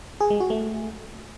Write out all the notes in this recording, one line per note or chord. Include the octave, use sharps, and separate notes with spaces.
G#4
G#3
F#4
A3